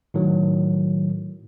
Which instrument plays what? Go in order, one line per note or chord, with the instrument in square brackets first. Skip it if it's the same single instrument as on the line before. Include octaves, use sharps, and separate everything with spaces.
[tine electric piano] A2 D#3 F#3